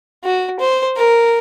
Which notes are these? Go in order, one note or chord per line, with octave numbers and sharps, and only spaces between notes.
F#4
C5
A#4